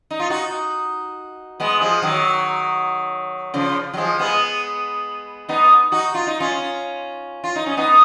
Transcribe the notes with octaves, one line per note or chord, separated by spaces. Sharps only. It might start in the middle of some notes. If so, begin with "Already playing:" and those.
D#4
F4
D#4 F#4
G#3 B3
F3 G#3
D#3 F#3
C#3 F3
F#3
F3 G#3
G#3 B3
B3 D#4
D#4 F#4
F4
D#4
C#4 F4
F4
D#4
C#4
B3 D#4